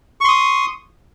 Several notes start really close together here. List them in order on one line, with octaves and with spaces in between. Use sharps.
C#6 C6 D#6